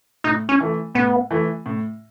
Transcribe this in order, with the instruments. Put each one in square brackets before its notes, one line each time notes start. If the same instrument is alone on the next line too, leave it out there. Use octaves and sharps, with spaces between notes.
[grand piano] A2 [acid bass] D#4
[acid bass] C#4
[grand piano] E3 A3
[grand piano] A2 [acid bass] B3
[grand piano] E3 A3
A2